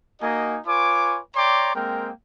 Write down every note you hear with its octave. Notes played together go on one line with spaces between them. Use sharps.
A#3 D#4 F#4 D#5 G#5
F4 B4 C#5 G#5 D6
C#5 D5 G5 A#5 C6 D6
G#3 A#3 C4 A#4 G5